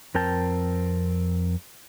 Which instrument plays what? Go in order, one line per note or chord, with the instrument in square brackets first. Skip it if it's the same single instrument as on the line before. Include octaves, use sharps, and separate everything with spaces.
[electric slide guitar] F2 C4 A#4 G5 A5